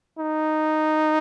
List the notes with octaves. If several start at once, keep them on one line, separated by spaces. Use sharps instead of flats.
D#4